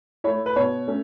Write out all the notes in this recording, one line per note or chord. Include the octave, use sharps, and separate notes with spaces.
A3 E4 C#5
B4
B2 C#5
A3 C#4